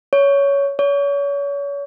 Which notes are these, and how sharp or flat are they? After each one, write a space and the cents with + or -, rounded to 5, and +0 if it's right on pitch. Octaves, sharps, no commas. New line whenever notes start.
C#5 +15
C#5 +35